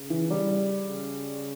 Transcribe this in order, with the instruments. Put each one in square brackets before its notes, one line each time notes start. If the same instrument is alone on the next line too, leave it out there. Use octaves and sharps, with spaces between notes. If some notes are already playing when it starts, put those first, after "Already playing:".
Already playing: [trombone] C#3
[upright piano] E3
G3
[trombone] C#3